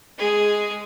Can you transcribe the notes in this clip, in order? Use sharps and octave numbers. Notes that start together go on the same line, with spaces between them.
G#3 G#4